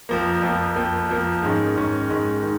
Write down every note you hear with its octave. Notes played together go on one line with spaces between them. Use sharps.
F2 F3 A#3
F2 F3 A#3
F2 F3 A#3
F2 F3 A#3
G#2 D#3 G#3 C#4
G#2 D#3 G#3 C#4
G#2 D#3 G#3 C#4
D#3